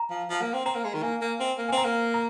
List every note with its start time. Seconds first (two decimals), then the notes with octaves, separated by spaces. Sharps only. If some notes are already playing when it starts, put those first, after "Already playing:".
Already playing: A#5
0.11 F3
0.30 F3
0.42 A#3
0.54 C4
0.65 C4 A#5
0.75 A#3
0.84 G#3
0.94 D#3
1.03 A#3 G#5
1.21 A#3
1.40 C4
1.58 A#3
1.69 C4 G#5
1.78 A#5
1.84 A#3
2.14 A#5